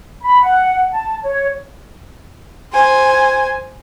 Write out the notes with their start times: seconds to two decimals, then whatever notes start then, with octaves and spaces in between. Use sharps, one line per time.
0.23 B5
0.42 F#5
0.92 A5
1.23 C#5
2.73 C5 G#5